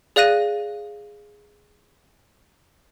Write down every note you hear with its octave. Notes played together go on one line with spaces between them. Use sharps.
G#4 D5 F5 F#6 A#6 D#7